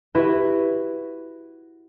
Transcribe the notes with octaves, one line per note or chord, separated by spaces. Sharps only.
E4 F#4 G4 B4 E5